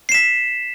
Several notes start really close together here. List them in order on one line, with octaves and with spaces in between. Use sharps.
C7 E7 B6